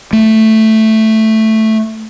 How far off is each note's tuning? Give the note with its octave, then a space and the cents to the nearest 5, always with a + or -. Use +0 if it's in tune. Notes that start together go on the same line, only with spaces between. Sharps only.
A3 +0